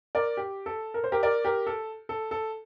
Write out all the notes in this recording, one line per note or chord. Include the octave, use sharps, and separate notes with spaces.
A#4 D5
G4
A4
A#4
C5
G4 A#4
A#4 D5
G4 A#4
A4
A4
A4